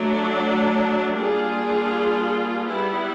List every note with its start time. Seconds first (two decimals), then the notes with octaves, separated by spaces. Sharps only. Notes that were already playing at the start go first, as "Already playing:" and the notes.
Already playing: F#3 A3 D4
1.13 G3 A#3 D4 F4 G#4
2.66 G3 B3 E4